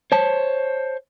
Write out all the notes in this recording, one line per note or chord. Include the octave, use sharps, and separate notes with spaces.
C5 C#5 A5